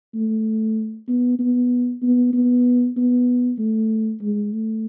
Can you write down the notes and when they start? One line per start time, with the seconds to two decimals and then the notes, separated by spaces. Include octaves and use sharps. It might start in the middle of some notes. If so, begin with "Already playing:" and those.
0.15 A3
1.08 B3
1.39 B3
2.03 B3
2.33 B3
2.97 B3
3.59 A3
4.22 G#3
4.53 A3